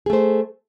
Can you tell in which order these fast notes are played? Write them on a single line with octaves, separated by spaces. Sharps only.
G#4 A3 C5